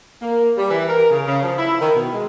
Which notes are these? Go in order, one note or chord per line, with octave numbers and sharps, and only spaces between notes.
A#3
G3
E3
A#4
C#3
C#3
F3
E4
D#3
B2
G#3